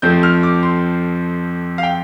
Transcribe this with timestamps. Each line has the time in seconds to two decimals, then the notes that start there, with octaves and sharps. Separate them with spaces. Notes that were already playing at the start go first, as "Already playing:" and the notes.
0.02 F2 F3 A3 C4 G6
0.23 F6
0.43 D6
0.63 C6
1.78 F5
1.83 G5